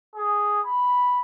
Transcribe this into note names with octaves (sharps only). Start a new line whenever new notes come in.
G#4
B5